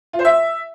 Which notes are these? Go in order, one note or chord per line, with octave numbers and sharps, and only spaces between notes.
F4
C5
E5